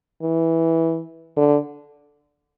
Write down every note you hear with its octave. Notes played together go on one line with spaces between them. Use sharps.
E3
D3